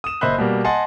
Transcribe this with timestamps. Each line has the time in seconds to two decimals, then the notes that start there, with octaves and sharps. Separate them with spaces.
0.04 D#6 E7
0.21 F#1 C5 D#5 E5 B5 F#6
0.38 B2 G3 A#3
0.64 D#5 F#5 G#5 A5 C6